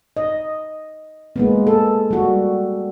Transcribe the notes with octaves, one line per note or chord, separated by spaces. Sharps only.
D#5
G#3 A#3 B3
A4
G3 F#4